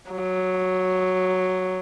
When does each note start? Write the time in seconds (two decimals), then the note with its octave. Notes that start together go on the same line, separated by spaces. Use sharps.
0.11 F#3